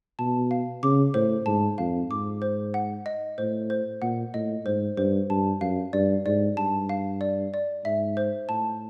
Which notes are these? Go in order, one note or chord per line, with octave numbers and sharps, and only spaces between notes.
B2 A5
F5
C#3 D6
A2 C5
G#2 A5
F2 F5
G#2 D6
C5
F#5
D#5
A2 C5
C5
A#2 F#5
A2 D#5
G#2 C5
G2 C5
G2 A5
F#2 F5
G2 D5
G#2 D5
G2 A5
F5
D5
D5
G#2 E5
C5
A2 A5